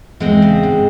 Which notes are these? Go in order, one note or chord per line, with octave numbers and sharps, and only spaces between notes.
E2 G#3 C4
C#3
G#2